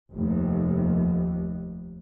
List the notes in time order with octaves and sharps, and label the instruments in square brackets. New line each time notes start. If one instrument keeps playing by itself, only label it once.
[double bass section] F1 D#2